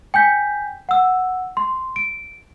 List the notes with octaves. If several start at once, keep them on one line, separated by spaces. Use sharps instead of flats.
G5 G#5 G6 B6
F#5 E6
C6
D7